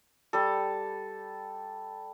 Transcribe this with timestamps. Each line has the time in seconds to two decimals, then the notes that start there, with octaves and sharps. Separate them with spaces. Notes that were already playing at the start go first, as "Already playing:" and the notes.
0.33 G3 A4